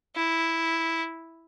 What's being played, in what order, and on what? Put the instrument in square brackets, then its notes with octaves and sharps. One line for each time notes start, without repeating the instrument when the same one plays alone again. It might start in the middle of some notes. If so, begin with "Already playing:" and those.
[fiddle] E4